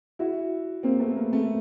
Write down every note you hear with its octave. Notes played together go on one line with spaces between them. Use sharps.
E4 F#4
A#3 C4
A3 B3
A#3
A3